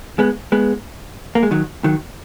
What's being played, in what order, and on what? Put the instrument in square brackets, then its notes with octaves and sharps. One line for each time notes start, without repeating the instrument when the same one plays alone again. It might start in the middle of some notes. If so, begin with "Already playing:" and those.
[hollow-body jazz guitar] G#3 B3
G#3 B3
A#3
G#3
D#3 F#3
D#3 F#3